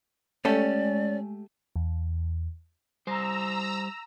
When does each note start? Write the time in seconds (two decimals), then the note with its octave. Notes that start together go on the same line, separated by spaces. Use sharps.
0.45 G#3 A3 C#4 G4 A4 D5
1.76 E2
3.07 G3 C5 A#5 E6